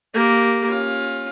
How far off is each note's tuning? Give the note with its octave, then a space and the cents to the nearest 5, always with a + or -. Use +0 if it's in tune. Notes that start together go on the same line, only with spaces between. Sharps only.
A#3 +0 G4 +0
C#4 -15 F4 +15